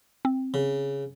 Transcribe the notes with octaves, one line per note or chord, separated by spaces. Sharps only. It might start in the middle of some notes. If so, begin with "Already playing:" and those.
C4
C#3